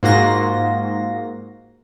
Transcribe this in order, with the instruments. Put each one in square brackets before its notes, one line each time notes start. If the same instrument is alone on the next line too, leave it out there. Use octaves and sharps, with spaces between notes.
[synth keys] G#2 A#3 F4 F#4 C6 A#6